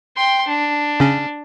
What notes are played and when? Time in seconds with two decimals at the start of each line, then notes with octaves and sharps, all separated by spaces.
0.16 G5 C6
0.47 D4
1.00 C#3 C#4